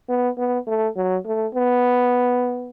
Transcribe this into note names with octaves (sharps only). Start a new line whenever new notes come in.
B3
B3
A3
F#3
A3
B3